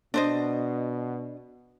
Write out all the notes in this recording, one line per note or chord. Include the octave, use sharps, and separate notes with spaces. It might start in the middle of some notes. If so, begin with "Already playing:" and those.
B2 D4 C5 D#5